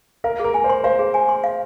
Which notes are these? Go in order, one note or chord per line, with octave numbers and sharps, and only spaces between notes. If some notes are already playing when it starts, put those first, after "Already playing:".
A#4 F5
G#4 A#4
G#5
C5
C6
C5 F5
G#4
G#5
C6
F5